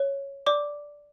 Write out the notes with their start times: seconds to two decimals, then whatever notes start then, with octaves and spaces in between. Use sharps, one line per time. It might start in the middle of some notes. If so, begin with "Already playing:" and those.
Already playing: C#5
0.46 D5 D6